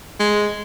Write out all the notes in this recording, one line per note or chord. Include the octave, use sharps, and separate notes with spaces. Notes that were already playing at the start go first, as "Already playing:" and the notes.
G#3